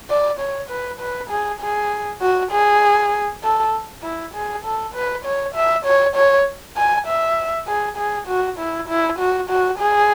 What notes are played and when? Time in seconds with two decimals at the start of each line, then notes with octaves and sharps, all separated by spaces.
0.10 D5
0.39 C#5
0.70 B4
1.00 B4
1.30 G#4
1.60 G#4
2.21 F#4
2.51 G#4
3.43 A4
4.03 E4
4.34 G#4
4.65 A4
4.94 B4
5.25 C#5
5.55 E5
5.86 C#5
6.16 C#5
6.77 G#5
7.07 E5
7.67 G#4
7.97 G#4
8.27 F#4
8.58 E4
8.88 E4
9.19 F#4
9.50 F#4
9.79 G#4